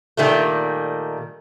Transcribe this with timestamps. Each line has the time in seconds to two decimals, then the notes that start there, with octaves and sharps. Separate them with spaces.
0.17 A#2 D#3 G3 A3